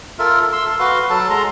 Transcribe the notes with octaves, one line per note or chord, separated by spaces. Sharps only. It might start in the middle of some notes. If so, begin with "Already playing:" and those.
F4 A4 A#4 E5
C6 E6
A4
F#4 B4 F5 C6
F#3 A4 A5
G#3 A#5 C6